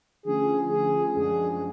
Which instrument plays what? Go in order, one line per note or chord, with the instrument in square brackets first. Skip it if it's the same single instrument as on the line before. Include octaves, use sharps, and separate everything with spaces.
[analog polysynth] D3 F3 A3 C#4 F4 [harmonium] G#4
[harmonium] G#4
[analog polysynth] F#2 F3 G#3 D4 F#4 [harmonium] G#4